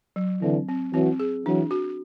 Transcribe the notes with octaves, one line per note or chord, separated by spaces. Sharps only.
F#3
D3 E3 C4
C4
E3 F#3 C4
G#4
E3 F#3 D4
F#4